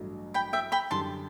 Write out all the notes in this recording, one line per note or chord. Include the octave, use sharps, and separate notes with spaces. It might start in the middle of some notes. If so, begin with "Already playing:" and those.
Already playing: A1 G2 F#3 A3
G5 B5
E5 G5
G5 B5
F#2 D3 G3 A5 C6